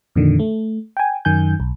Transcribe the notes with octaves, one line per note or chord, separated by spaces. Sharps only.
F2 A#2 D3 D#3
A3
G5 G#5
F#2 D#3 G#5 G6
B1